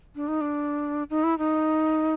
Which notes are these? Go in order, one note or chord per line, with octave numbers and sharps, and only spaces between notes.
D4
D#4
D4
D#4
E4
D#4